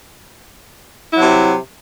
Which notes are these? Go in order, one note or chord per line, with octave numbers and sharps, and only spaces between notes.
C3 F#3 E4